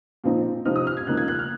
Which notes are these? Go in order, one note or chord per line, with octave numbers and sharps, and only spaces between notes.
A#2 F3 C4 D#4
C3 F3 C4 D#4 F6
D#6
F6
G#6
C#3 F3 A#3 D#4 F#6
G#6
F#6
F6